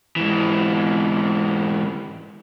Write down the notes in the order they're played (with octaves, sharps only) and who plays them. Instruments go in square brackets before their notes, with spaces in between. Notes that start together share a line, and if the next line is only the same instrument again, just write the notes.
[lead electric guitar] G#2 E3